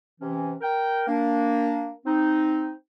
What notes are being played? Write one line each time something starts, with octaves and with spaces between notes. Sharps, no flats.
C3 E3 C#4
A#4 G5
A#3 D4
C4 D#4